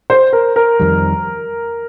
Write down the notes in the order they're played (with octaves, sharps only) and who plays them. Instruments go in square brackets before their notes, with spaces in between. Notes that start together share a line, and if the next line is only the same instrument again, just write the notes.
[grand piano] C5
A#4
A#4
[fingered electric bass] F2 D#3 G3